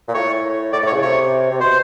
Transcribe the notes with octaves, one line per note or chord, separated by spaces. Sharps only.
A#2
A2 C#5
A2 D5
A2 C#5
C#3
C3 C#5
C3
B2 C5